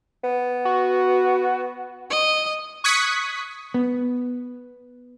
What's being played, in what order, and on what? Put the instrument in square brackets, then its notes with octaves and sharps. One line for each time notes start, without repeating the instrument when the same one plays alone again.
[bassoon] B3
[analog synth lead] F#4
[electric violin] D#5
[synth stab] C#6 D#6 F#6 G#6 B6 C#7
[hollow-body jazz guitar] B3